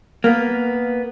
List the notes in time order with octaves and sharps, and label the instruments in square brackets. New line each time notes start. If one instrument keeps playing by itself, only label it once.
[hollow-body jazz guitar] A#3 B3